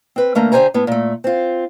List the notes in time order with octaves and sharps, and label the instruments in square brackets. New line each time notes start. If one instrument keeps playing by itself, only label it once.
[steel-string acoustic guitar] C4 B4
D3 A3 A#3 A#4
D3 G4 A#4 C5 G#5 A#5
A2 B3
A#2 A3
C4 F4